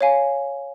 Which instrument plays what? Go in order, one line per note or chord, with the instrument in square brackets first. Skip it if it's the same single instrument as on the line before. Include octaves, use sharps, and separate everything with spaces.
[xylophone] C#5 F5 G#5